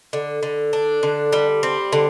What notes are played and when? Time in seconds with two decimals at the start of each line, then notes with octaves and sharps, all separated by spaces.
0.13 D3
0.43 D3
0.73 D4
1.03 D3
1.33 G3
1.63 C4
1.93 D3